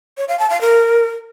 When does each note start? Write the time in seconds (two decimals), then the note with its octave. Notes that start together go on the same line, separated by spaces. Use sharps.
0.17 C#5
0.28 F5
0.39 A5
0.50 F5
0.61 A#4